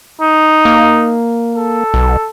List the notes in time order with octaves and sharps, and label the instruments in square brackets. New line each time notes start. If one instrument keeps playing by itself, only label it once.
[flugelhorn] D#4
[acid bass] A#3
[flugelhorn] A4
[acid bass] B1